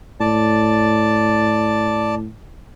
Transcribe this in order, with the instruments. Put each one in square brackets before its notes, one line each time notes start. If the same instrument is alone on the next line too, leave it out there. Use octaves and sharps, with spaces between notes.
[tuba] A2 [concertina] D5 A5